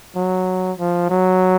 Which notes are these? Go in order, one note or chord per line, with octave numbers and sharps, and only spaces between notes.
F#3
F3
F#3